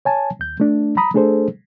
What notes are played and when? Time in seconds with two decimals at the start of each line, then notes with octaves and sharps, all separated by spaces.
0.05 C#5 G#5 A5
0.39 D#2 G6
0.60 A3 D4
0.97 A#5 B5 D#6
1.14 A3 D4 G#4 A4 C5